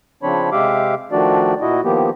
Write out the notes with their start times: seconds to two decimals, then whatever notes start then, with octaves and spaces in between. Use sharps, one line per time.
0.23 C#3 F3 C4 D4 C#5 B5
0.52 C3 G#3 G4 E5 F5 D6
1.12 D#3 F3 A3 D4 F#4 D5
1.61 A#2 E4 F#4 D#5
1.84 D#3 F3 A#3 B3 G4